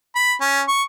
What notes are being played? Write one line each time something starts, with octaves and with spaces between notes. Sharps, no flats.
B5
C#4
C#6